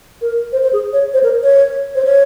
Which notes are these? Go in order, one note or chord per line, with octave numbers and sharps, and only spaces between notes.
A#4
C5
C5
G#4
C#5
C5
A#4
C#5
C5
C#5